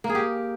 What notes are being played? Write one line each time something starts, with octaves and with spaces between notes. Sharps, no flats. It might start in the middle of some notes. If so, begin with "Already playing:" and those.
A#3
G#4
G4